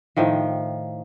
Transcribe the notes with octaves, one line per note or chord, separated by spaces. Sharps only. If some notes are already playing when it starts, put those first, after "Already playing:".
A2 D#3 F3